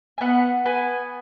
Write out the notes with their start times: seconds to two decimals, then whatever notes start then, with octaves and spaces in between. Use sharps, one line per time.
0.18 G#5
0.21 B3 F#5
0.66 B3 G#5